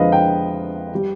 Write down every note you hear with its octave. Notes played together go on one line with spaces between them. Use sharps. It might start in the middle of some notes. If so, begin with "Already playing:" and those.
Already playing: F2 D3 F3 G#3 B4 D#5 F5
G5
G3